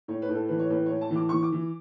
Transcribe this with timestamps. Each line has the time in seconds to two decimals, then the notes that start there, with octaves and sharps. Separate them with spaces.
0.08 A2 C#5
0.22 B4
0.29 A2
0.35 A4
0.48 E3 B4
0.59 C#5
0.70 A2 B4
0.86 A2 C#5
1.01 A5
1.11 E3
1.16 D6
1.29 E3 C#6
1.43 D6
1.52 E3